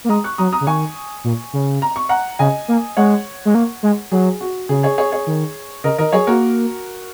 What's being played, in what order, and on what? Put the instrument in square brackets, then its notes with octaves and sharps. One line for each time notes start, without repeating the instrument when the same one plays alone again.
[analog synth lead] A#3
[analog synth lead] G#3 [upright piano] A#5 D#6
[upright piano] C#6 F#6
[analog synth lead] F#3 [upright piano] A#5 D#6
[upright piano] A#5 D#6
[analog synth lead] C#3
[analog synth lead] D#3 [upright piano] G#5 C#6
[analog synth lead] A#2
C#3
[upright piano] A#5
C#6
F#5 A#5
[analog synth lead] C#3 [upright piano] D#5 G#5
[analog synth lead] A#3
[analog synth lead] G#3 [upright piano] C#5 F#5
[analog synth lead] G#3
A#3
G#3
[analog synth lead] F#3 [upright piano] G#4
[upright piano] F#4
[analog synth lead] C#3 [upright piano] G#4
[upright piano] G#4 C#5
G#4 C#5
G#4 C#5
[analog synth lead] D#3
[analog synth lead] C#3 [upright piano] A#4 D#5
[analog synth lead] D#3 [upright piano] A#4 D#5
[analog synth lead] F#3 [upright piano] G#4 C#5
[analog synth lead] A#3 [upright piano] F#4 A#4